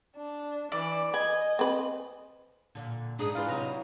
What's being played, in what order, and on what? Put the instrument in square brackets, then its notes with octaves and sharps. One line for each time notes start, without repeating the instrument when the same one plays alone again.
[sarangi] D4
[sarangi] E3 [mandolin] D5
[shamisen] B4 [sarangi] D#5 [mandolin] G#5
[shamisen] C4 B4
[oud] A#2 D3
[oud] G#2 [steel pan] D4 D#6 [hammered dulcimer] D#4 [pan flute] G#4
[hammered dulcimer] E3 [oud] D4 F4 [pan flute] E4 [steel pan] B4 F5
[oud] C3 [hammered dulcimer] F#3 D#4 [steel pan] A#5